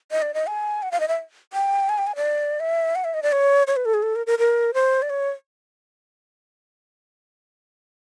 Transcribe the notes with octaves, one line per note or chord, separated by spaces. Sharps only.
D#5
D5
D#5
G#5
F#5
F5
D#5
E5
G5
G#5
G5
G#5
D5
E5
F#5
E5
D#5
D5
C#5
C#5
B4
A4
G#4
A4
A#4
A#4
A#4
C5
D5
C#5